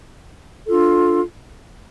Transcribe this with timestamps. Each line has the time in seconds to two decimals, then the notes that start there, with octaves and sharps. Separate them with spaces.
0.67 D4 F4 A4